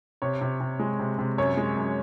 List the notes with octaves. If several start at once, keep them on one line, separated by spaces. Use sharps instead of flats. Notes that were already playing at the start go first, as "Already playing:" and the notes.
C3 C#5
C3
C3
G#3
C3
C3
F#2 C#5
G#3
F#2